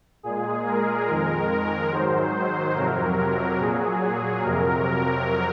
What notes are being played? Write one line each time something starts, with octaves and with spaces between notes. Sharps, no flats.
A#2 G#3 G#4
A#4
F2 D#3 G#3
G#2 D#3 F#3 C5
F2 C3 F#3 A#4
A#2 F#3 G#4
F2 C3 F#3 A#4